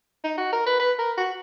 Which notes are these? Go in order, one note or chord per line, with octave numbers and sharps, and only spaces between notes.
D#4
F#4
A#4
B4
B4
A#4
F#4